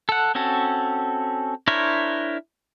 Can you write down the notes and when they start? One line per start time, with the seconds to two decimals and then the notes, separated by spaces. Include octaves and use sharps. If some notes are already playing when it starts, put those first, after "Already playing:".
0.09 A4 F#5
0.35 C4 C#4 F#4 A4
1.68 D4 E4 A#4 C5 C#5